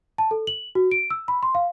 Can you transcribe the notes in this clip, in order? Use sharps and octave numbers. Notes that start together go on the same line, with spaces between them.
A5
A4
F#7
F#4
D7
E6
B5
C6
F5